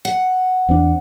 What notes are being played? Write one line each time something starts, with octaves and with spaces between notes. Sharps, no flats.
F#5
E2 C4 D4